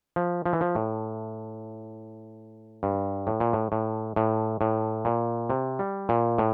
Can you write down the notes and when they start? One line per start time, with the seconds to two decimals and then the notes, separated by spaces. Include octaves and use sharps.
0.16 F3
0.46 F3
0.53 E3
0.61 F3
0.75 A2
2.83 G2
3.27 A2
3.40 A#2
3.53 A2
3.72 A2
4.16 A2
4.61 A2
5.05 A#2
5.50 C3
5.79 G3
6.09 A#2
6.38 A2